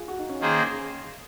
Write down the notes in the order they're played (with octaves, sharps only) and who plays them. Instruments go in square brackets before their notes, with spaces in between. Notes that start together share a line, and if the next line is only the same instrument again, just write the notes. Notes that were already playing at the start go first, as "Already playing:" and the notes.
Already playing: [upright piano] F4 G#4
F#4
D#4
C#4
[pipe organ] D#3 A#3 D#4 G#4 C5